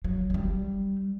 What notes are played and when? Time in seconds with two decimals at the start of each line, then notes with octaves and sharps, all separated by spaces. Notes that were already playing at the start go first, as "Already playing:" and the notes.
0.04 F#3
0.30 G#3
0.34 G3